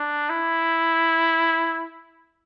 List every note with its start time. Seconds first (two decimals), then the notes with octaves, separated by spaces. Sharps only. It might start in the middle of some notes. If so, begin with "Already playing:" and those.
Already playing: D4
0.30 E4